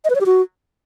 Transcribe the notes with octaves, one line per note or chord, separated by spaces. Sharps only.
D#5
B4
C#5
G4
F#4